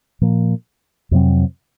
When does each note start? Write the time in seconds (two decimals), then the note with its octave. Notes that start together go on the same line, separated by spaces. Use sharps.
0.21 A#2 F3 A#3
1.11 F2 C3 F#3 C4